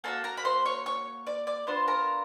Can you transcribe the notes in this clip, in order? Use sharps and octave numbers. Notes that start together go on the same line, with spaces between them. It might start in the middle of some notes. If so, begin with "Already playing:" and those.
A#3 D4 F#4 A4 A5
A#4 A#5
B5
C5 C6
C#5 C#6
C#5 C#6
D5 D6
D5 D6
B3 D4 F4 C5 C6
A#4 A#5